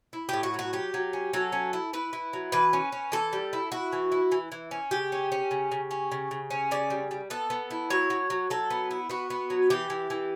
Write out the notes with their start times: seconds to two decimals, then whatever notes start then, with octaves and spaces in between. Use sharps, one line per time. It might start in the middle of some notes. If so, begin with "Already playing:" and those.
0.13 E4
0.29 A2 G4
0.43 F#4
0.54 F#3 F#4
0.73 F#3 G4
0.94 F#3
1.13 C#4
1.33 F#3 A4
1.52 C#4
1.73 E4
1.93 E4 B4
2.13 E4
2.33 F#3
2.52 E3 B4
2.73 C#4
2.92 C#4
3.12 E3 A4
3.33 G3
3.53 E4
3.72 E4 F#4
3.93 E3
4.12 E4
4.32 E3
4.52 E3
4.71 C#4
4.91 C#3 G4
5.12 C#4
5.32 C#4
5.51 C#3
5.71 C#3
5.91 C#4
6.12 C#3
6.31 C#3
6.50 C#4
6.71 C#3 D5
6.90 G3
7.11 G3
7.30 B3 A4
7.50 B3
7.71 E4
7.90 F#3 C#5
8.10 F#3
8.30 F#3
8.50 F#3 A4
8.70 B3
8.91 E4
9.10 B3 F#4
9.30 B3
9.50 F#3
9.70 E3 G4
9.90 E3
10.10 E3